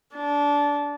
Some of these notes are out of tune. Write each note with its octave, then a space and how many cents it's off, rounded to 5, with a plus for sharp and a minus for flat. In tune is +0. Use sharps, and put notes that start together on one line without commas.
D4 -20